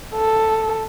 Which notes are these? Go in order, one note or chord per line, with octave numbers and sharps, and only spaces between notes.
A4